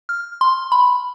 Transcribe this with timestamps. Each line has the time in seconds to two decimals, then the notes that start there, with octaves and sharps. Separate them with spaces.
0.09 F6
0.41 C6
0.72 B5